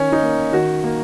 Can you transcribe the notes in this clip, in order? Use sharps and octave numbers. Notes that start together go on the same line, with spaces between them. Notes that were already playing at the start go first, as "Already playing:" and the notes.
Already playing: D#3 C#4
D#4
A#3
D#3 F#4
A#3